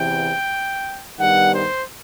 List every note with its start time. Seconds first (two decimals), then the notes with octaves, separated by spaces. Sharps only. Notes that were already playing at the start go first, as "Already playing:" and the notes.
Already playing: E2 C3 E3 G5
1.19 G2 D#3 G3 B3 F#5
1.52 C5